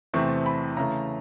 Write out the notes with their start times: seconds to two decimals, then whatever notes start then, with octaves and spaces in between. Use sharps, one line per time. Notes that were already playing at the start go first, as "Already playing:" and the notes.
0.14 E2 C3 E3 A3 C4 C#6
0.46 B5
0.77 C#3 E3 A3 A#5